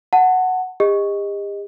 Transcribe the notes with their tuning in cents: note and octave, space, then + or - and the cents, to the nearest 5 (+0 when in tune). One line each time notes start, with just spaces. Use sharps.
F#5 +0 A5 +20
G4 +45 D#5 +0